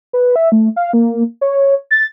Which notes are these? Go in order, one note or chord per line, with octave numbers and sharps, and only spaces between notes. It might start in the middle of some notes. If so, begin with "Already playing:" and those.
B4
E5
A3
F5
A#3
C#5
A6